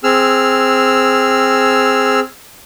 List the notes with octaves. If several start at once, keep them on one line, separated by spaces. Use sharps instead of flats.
C4 G#4 E6 F6